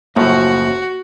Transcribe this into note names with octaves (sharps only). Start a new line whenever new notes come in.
F#1 F#2 A2 F3 A#3 F#4